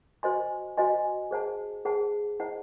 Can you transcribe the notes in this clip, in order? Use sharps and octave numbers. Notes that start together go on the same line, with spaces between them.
F#4 C5 D#5 G#5 C6
F#4 C5 D#5 G#5 C6
G#4 C5 F#5 A5
G#4 C5 F#5 A5
E4 C5 D#5 F#5 A5